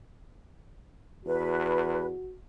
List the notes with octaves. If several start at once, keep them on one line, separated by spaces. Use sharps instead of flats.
E2 F#4 B4